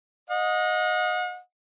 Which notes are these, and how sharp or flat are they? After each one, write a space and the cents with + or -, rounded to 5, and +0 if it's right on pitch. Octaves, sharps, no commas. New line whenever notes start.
D#5 +0 F#5 -40